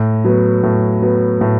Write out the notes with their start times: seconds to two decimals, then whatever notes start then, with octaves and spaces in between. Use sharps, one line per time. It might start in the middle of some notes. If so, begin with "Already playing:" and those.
Already playing: A2
0.25 F#3 B3
0.63 A2
1.02 F#3 B3
1.41 A2